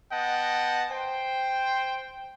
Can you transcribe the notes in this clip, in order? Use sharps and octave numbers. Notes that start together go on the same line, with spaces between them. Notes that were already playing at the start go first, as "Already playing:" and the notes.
B3 D#5 F#5 G5 A5
C5 G5